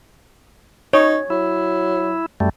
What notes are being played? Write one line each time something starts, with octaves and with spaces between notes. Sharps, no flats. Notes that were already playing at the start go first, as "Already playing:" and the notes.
D#4 C#5
F#3 E4
F#2 G3 A3